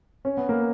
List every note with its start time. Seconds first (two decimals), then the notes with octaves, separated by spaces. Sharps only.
0.25 C#4
0.37 B3
0.49 A#3